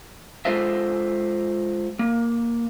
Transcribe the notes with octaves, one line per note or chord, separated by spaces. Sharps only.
G#3 F4 A4 C5 D#5 E5
A#3